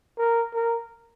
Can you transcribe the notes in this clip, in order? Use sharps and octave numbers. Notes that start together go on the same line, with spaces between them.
A#4
A#4